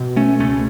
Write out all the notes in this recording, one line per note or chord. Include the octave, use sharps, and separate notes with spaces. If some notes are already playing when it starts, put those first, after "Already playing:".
Already playing: B2
A3 C#4
C#2 A3 C#4